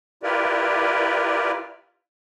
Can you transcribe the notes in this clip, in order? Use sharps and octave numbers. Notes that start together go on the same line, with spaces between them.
E4 F4 G4 A#4 B4 D5